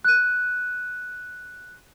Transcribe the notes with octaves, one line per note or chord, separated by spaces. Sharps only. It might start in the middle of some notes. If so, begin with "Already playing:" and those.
F#6 D#7